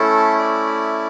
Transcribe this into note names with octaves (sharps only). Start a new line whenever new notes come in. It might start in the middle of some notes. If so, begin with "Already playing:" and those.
Already playing: A3 C#4 E4 A4
D5